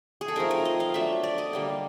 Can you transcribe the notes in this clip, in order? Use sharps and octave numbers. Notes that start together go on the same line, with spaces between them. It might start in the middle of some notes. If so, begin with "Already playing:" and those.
G#4
A4
F3 A3 C4 D#4 A#4
A#4
D#5
F5
F#3 A3 D4 E5
D5
D#5
D3 G3 A#3